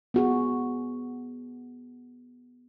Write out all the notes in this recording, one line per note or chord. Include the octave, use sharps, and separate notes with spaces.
B3 F#4 G#4